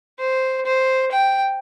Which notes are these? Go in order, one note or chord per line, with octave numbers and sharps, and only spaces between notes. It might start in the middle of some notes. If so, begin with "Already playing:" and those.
C5
C5
G5